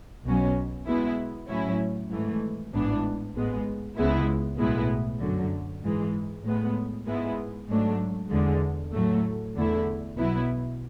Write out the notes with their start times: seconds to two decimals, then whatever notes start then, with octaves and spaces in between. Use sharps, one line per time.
0.25 B1 B2 F#3 C#4
0.87 B2 G#3 B3 E4
1.49 A2 F#3 C#4 E4
2.11 G#1 G#2 E3 A3
2.73 A1 G#2 E3 B3 D4
3.36 A1 G#2 G#3 B3
3.97 C#2 C#3 G#3 B3 E4
4.59 B1 A2 G#3 B3 E4
5.21 F#2 D3 F#3
5.83 G#2 E3 G#3
6.44 A2 G#3 B3
7.07 G#2 G#3 B3 E4
7.69 G#2 F#3 A3 D4
8.31 E2 D3 G#3
8.93 A2 F#3 A3
9.55 E2 D3 A3 E4
10.17 B1 B2 F#3 B3 E4